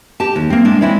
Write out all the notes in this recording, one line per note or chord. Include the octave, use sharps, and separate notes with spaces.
G4 A5
D#2
A#3 C4
A2 G#3 D4
G#3 C4 E4 C#5 D5